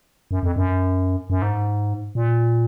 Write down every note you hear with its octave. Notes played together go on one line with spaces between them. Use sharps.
F#2
F2
F#2
F#2
G#2
A#2